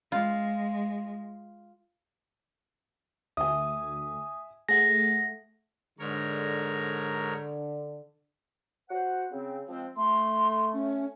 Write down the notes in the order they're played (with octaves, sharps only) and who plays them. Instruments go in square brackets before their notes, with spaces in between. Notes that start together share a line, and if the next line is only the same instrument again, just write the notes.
[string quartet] G#3 [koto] F4
[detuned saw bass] D2 [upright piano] E5 G#5 [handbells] D#6
[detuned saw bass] A3 [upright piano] G#4 F#5 [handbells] A#6
[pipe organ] G#2 A#4 C#5 [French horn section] D3
[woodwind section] F#4 C5 F#5
C#3 C4
F3 G#3 C4
[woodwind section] A3 [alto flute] C6
[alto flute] C#4